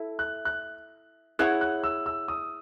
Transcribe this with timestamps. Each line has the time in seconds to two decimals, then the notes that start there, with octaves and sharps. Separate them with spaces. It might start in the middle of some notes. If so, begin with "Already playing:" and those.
Already playing: E4 A4 E5
0.19 F#6
0.45 F#6
1.39 E4 G#4 C#5 F#5 F#6
1.61 F#6
1.84 E6
2.06 E6
2.28 D#6